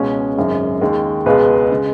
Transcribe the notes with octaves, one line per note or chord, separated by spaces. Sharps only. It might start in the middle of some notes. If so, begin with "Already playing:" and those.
Already playing: C#2 B2 G#3 C#4
G#1 F#2 C#3 G#3
D#2 D#3 G#3
C#2 B2 G#3 B4
C#3 G#3